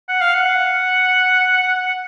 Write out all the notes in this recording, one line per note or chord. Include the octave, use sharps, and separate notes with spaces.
F#5
F5
F#5